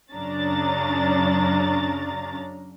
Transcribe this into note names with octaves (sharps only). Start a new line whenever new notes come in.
F#2 C#3 C#4 D4 A#5 A6